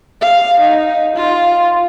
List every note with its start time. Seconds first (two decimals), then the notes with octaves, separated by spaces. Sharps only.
0.22 F5
0.61 D#4
1.16 F4